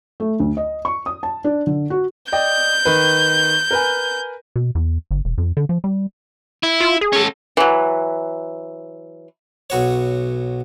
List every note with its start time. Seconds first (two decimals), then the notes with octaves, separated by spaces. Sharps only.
0.20 A3
0.40 D2
0.57 D#5
0.85 C#6
1.06 D#6
1.23 A5
1.44 D4
1.67 D3
1.90 F#4
2.32 D5 D#5 G5 G6
2.85 D#3 B4
3.71 A#4 B4 G#5
4.56 B2
4.75 E2
5.11 G1
5.25 E1
5.38 F2
5.57 D3
5.69 F3
5.84 G3
6.63 E4
6.81 F4
7.01 G#4
7.13 C#4 A4
7.57 E3 F#3
9.70 B1 F#4 C#5